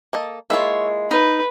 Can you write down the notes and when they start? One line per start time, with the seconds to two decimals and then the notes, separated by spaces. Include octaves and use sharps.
0.13 A#3 A4 D#5
0.50 G#3 A#3 E4 F4 C#5 E5
1.11 D#4 B4